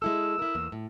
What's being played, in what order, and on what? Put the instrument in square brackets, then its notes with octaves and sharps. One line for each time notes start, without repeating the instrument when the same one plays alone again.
[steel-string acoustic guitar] G#3 E4 A4 [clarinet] E6
[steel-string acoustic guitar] E4 A#4
E2 A#3
A2